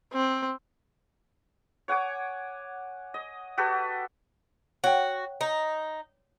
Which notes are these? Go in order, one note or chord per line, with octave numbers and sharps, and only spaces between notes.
C4
C#5 F#5 G#5 D6
D#5
F#4 G4 A4 B4
F#4 C#5 G5
D#4